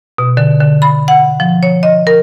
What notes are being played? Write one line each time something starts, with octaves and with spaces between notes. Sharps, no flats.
B2
D3
D3
B5
F#5
F3
C#5
D#5
A#4